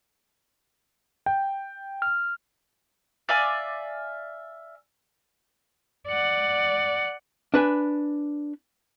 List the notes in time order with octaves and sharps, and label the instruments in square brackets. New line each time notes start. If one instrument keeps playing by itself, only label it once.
[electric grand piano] G5
[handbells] F6
[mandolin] D5 E5 F5 G#5
[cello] D5 F#5
[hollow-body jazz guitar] D4 B4 G#5